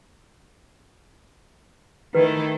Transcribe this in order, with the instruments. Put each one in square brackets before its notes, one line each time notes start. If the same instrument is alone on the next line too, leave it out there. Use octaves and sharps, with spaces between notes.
[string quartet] D#3 A3 E4 [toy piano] B4